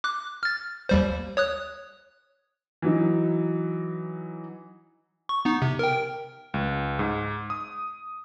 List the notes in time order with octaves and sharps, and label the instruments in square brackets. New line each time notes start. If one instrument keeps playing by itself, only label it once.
[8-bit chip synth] D6 F#6
F6 A6
D#2 G3 C5
C#5 D#6 F#6
[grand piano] E3 F#3 D#4
[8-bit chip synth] C#6
B3 D#4
C3
A#4 G5
[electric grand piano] C#2
G#2
D#6